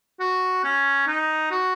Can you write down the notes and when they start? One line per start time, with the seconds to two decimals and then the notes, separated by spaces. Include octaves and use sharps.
0.20 F#4
0.64 C#4
1.07 D#4
1.51 F#4